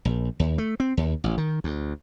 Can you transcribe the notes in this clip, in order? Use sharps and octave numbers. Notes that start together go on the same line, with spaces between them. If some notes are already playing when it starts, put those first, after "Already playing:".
A#1
D#2
A3
C4
D#2
A1
D#3
D2